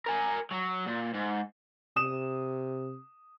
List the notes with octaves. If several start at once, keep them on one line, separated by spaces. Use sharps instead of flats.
A#4 G#5
F#3
A#2
G#2
C3 D#6 E7